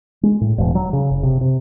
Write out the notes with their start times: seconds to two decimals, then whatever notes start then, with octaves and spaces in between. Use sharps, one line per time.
0.23 G#3
0.41 A2
0.58 E1
0.75 F#3
0.93 C#3
1.10 F#1
1.23 C3
1.41 C3